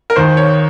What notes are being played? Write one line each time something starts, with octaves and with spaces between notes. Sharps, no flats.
A#4
D#2 D#3 C5
C#5